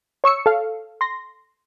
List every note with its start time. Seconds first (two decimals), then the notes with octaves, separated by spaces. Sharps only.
0.24 C#5 C#6 E6 C#7
0.46 A4 F5
1.01 C6 A#6